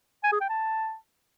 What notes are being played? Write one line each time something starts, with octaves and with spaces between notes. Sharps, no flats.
G#5
G#4
G5
A5